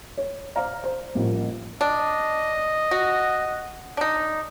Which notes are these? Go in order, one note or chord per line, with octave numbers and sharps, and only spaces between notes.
C#5
C5 D5 F5 A#5
C5
A1 F3 G3 A#3
D4 D#5
F#4
D4 D#4